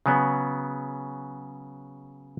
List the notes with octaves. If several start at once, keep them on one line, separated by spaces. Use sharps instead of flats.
C#3 F#3 B3